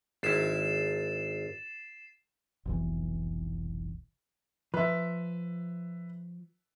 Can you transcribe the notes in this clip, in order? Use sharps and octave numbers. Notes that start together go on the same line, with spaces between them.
G#1 E4 A6 C7 E7
F1 B1 E3
F3 B4 E5